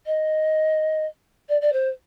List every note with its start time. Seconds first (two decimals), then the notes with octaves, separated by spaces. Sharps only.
0.06 D#5
1.49 D5
1.61 D5
1.73 C5